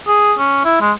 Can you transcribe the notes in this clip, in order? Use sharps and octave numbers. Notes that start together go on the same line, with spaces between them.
G#4
C#4
E4
G#3